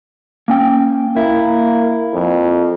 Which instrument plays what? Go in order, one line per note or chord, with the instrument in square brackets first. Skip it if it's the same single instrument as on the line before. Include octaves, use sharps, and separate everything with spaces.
[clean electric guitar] A#3 C#4 G5
[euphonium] A#3 [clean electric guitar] E4
[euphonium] F2